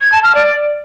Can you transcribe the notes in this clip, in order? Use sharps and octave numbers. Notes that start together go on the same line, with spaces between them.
G#6
A5
F6
D5